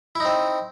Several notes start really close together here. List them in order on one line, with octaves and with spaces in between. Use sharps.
E4 D#4 C4